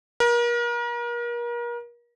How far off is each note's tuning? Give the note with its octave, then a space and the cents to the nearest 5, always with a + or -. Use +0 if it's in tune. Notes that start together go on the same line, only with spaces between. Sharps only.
A#4 +35